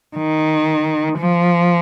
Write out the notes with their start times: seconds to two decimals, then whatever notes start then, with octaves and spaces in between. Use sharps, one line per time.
0.17 D#3
1.19 F3